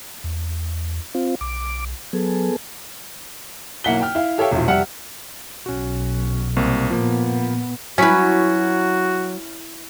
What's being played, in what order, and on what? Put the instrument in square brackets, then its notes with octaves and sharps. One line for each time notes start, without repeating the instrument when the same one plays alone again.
[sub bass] E2
[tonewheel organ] C4 F4
[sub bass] B1 [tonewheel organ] D6
[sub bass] F#3 [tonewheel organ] B3 G#4 A4
[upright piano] B1 A#3 E4 F#5 B6 G7
G5 F6
E4 F5
G4 A4 C#5 E5 F5 G5
E1 A#1 E4 F4
F1 G3 E5 F#5 F6
[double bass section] B1 [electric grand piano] C#4 F#4
[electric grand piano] C2 A#3 C4
[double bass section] A#2 B3 [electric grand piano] F3 A#3
[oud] F#3 B4 [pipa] C#4 [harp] E4 B6 [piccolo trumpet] F#4